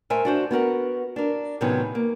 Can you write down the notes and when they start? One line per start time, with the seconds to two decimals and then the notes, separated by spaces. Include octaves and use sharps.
0.10 A3 A#4 C5 E5 G#5
0.25 D4 F#4 C5
0.51 B3 F#4 A#4 F#5
1.16 D4 A#4
1.61 A2 C3 D#3 F#3 B3 C#4
1.95 A#3